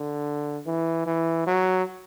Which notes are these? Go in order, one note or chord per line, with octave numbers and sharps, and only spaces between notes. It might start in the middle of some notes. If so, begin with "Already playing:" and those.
Already playing: D3
E3
E3
F#3